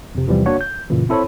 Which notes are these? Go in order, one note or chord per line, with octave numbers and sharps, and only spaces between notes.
F2 C3
E2 C3 E3 F3 G3
A#3 D4 F#4 C#5 F#5
G6
F#2 A#2 C#3 E3
C4 E4 A4 C5 C#5 B5